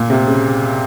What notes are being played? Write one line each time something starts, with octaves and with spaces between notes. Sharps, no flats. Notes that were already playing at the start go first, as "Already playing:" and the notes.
Already playing: A#2
C3
C#3